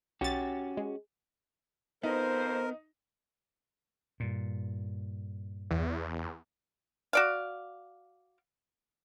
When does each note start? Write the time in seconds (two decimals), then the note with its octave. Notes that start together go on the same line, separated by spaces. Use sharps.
0.21 B1 C#4 F#4 G4 A6
0.77 G#3
2.03 F2 B3 D#4 A#4 C5
4.20 G2 A#2
5.71 E2
7.13 F#4 D5 F5